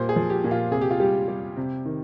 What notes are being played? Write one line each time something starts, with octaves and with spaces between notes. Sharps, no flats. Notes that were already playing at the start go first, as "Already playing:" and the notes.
Already playing: A#2 G3 C5
G#4
F3
G4
A#2
F4
C3 G#4
G4
F4
G3 G4
G3
C3
D#3